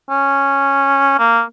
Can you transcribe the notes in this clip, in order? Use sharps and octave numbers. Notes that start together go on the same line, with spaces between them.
C#4
A#3